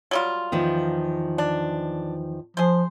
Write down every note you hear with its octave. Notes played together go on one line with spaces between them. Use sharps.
F#3 G3 F4
E2 D#3 F3
D4
F3 G#4 C5